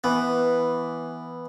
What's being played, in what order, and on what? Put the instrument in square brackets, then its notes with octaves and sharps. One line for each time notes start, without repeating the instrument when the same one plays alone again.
[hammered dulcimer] E3 [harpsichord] B3